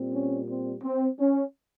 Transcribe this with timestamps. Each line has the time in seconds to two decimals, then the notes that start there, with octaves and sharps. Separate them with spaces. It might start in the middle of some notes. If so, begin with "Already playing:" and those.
Already playing: A#2 G3 C4
0.14 C#4
0.48 C4
0.83 C4
1.18 C#4